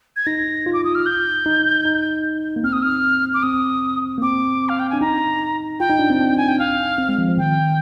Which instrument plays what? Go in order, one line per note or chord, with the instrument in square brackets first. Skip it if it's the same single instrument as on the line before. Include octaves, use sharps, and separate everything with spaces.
[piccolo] G#6
[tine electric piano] D#4 [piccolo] A#6
[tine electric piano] F4
[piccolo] D6
D#6
F6
G6
[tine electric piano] D#4
D#4
A#3
[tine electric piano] C4 [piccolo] F6
[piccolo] D#6
F6
D6
[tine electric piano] C4 [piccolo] D#6
[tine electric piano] A#3
[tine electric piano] C4 [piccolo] D6
[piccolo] F5
G5
[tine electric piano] D4 [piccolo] G#5
[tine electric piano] D#4 [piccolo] A#5
[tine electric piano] F4 [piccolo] G5
[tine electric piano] D#4
D4
C4
D4
[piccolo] G#5
G5
F5
[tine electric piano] C4
G#3
F3
F3
[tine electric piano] D#3 [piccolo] G5